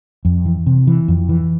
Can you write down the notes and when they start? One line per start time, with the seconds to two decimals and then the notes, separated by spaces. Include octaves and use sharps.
0.25 F2
0.46 E3
0.66 C3
0.87 E3
1.08 F2
1.29 E3